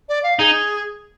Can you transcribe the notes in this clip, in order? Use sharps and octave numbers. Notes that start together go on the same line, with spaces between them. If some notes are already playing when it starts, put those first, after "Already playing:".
D5
F5
D#4 G#4